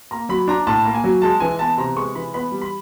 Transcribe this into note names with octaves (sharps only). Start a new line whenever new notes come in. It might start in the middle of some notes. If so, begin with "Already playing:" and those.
A#3 A#5
F#3 B5
D4 A#5
A2 A5
A#3
G#5
F#3
G#3 A5
E3 G#5
B3 A5
C3 A#5
G#3 C#6
E3 B5
B3 B5
G3
B5